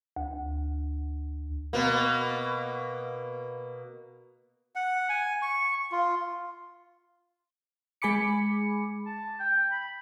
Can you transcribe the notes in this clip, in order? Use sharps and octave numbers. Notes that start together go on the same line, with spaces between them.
D2
B2 A#3
F#5
G#5
C#6
F4
G#3 G#4 G#5 B5 D6 C#7
A5
G5
B5